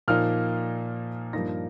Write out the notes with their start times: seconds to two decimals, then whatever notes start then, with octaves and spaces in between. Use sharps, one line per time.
0.08 A#2 F3 A#3 D#4 F6
1.33 G2 F3 A#3 D#4 A#6